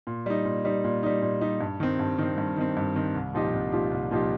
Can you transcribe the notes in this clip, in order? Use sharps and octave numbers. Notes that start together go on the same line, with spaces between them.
A#2
G3 D#4
A#2
G3 D#4
A#2
G3 D#4
A#2
G3 D#4
G2
D#3 C4
G2
D#3 C4
G2
D#3 C4
G2
D#3 C4
C2
A#2 F3 D#4 G4
C2
A#2 F3 D#4 G4
C2
A#2 F3 D#4 G4